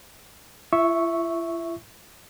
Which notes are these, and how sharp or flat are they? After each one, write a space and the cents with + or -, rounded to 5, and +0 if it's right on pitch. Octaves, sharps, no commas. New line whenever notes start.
E4 +45 E5 +0 C#6 +0